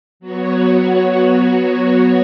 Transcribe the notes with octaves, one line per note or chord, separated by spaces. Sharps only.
F#3 B3 F#4 C#5